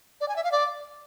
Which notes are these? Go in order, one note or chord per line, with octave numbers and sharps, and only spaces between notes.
D5
G#5
E5
F5
D5